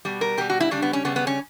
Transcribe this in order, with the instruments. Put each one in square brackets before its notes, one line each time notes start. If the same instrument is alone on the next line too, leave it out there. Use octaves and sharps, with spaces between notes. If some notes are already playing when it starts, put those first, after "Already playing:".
[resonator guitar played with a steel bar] B2 G3
A#4
B2 G3 G4
F#4
E4
C#3 G3 D4
B3
C#4
C#3 G3 B3
B3
C#4